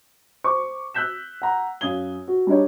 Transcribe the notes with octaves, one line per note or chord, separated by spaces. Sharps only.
C5 C#6 D6
E6 F#6 G6 B6 E7
F#5 A#5
F#2 F5 D#6 G#6 G7
F#4
G3 D4 D#4 C#5